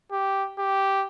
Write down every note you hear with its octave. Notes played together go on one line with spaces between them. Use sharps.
G4
G4